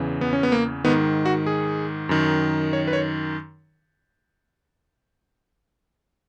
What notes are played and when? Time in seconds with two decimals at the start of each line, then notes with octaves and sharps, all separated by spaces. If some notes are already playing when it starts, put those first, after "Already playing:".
Already playing: E2 C#3 E3
0.21 B3
0.33 C#4
0.43 B3
0.52 A#3
0.84 G#2 D#3 B3
1.25 F#4
1.46 G#4
2.09 F#2 D#3
2.73 C#5
2.88 B4
2.93 C#5